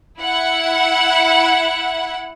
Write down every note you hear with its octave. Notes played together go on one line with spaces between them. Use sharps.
E4 F#5